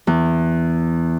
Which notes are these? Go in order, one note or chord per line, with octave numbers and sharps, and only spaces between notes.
E2